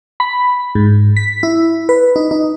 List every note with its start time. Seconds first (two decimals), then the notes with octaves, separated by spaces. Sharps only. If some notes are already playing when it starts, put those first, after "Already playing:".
0.20 B5
0.75 G#2
1.17 B6
1.43 E4
1.89 B4
2.16 D#4
2.31 D#4